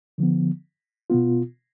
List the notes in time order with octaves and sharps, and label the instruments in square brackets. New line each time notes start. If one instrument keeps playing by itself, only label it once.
[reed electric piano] D3 F3 B3
B2 B3 F4